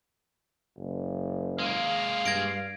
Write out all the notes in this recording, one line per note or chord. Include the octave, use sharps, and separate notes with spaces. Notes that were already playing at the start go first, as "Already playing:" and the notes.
F#1
G#3 A#3 F5
G2 G#6 A#6 D7